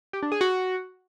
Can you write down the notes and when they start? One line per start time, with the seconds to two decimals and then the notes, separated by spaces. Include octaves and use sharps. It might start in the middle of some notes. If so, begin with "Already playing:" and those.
0.13 G4
0.23 D4
0.32 G#4
0.41 F#4